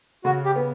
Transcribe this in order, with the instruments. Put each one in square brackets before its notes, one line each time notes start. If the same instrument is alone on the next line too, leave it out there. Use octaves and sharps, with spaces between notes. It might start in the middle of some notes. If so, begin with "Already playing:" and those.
[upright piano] C#3 [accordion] F#4
[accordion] G4
[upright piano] B3